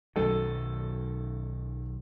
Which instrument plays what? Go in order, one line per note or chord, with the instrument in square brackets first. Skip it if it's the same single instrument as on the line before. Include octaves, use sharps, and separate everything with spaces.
[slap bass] B1 D#3 [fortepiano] F#2 A4